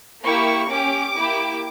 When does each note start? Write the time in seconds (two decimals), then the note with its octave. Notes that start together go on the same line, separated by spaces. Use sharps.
0.24 A#3 E4 G4 C#6
0.69 C#4 G4 D6
1.16 A#3 E4 G4